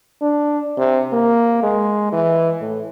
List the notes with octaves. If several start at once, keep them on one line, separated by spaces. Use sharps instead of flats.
D4
C3
A#3
G#3
E3
A2